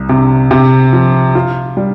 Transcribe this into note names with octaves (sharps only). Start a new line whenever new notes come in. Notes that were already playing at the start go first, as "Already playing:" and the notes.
Already playing: C2
C3
C3
F3
F4
G3